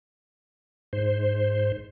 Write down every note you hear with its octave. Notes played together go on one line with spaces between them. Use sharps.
G#2 C5